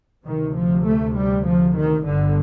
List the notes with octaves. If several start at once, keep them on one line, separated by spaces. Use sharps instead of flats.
D2 C3 D#3
F3
A3
G3
F3
D#3
G1 G2 D3